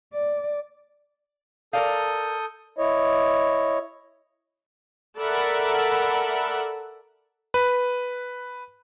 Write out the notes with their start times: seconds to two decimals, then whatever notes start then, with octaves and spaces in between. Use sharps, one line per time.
0.14 D5
1.73 A4 A#4 D5 F5 D#6 G6
2.78 E4 C#5 D#5
5.19 A4 A#4 D5 E5 F#5 B5
7.54 B4